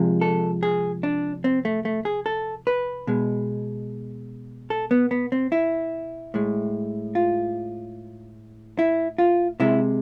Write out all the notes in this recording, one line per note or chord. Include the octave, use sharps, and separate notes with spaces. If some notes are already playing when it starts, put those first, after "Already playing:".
Already playing: C3 F3 G#3
A4
G#4
D4
C4
A3
A3
G#4
A4
B4
B2 G#3
A4
B3
B3
C4
E4
A2 G#3
F4
E4
F4
C3 G#3 E4